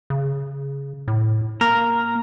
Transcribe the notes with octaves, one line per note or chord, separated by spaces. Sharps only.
C#3
A2
A#3 A#4